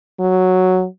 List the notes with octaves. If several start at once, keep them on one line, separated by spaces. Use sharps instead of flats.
F#3